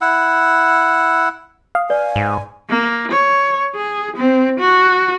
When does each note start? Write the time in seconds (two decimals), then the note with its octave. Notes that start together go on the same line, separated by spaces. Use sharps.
0.01 E4 F#5 E6
1.75 F5 D#6
1.90 B4 D5 G#5
2.16 G#2
2.70 A#3
3.12 C#5
3.76 G#4
4.17 C4
4.60 F#4